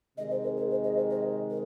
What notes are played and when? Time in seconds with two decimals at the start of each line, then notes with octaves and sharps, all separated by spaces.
0.17 C3 D#3 G#3 D#5
0.31 C5
0.43 A#4
0.57 G#4
0.70 C5
0.84 D#5
0.97 C5
1.10 D#5
1.50 A#4